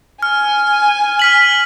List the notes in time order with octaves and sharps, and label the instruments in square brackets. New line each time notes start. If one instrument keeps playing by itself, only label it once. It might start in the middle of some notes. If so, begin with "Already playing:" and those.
[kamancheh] G#5 [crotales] F6
[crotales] F6 B6 F#7